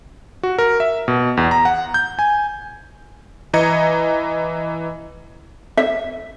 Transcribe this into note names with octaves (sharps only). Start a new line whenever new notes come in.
F#4
A#4
E5
B2
E2
A#5
F#5
G6
G#5
E3 D#5 A#5 G#6 C#7
E5